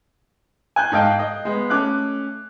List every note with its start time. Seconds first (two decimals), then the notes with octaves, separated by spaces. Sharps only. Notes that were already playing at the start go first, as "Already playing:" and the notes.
0.76 G#5 F#6 G6
0.92 G#2 A4 D#5 F5 G5
1.19 D#5
1.45 G#3 B3
1.70 A3 C#4 D6 F#6